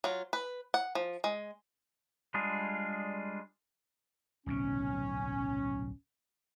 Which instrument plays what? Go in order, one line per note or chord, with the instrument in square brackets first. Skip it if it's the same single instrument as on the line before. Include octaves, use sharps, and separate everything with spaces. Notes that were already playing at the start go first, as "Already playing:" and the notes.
[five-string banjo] F#3 F4
B4
F#5
F3
G#3
[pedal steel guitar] G3 G#3 D4 F4 G#4
[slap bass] D1 B1 C3 [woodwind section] C#4